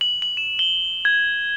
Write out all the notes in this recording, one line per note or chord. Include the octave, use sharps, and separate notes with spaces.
F#7
F#7
E7
G7
G#6